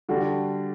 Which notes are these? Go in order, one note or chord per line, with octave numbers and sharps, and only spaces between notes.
D3 G3 D4 F#4